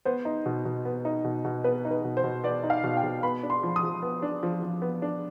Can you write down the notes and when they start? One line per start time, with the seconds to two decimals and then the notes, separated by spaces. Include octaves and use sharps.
0.05 B3 C5
0.25 D#4
0.46 B2
0.65 B2
0.85 B3
1.05 D#4
1.24 B2
1.45 B2
1.64 B3 B4
1.85 D#4
1.91 B4
2.04 B2
2.17 C5
2.24 B2
2.44 B3 D5
2.63 D#4
2.70 F5
2.84 B2
2.97 G5
3.03 B2
3.23 B3 B5
3.43 D4
3.50 C6
3.63 F3
3.76 D#6
3.83 F3
4.02 B3
4.22 D4
4.43 F3
4.63 F3
4.82 B3
5.02 D4